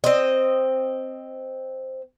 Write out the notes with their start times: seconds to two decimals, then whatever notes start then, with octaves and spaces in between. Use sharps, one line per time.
0.04 C4 D#5